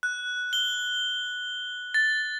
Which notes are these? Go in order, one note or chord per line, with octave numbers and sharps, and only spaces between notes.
F#6
G7
A6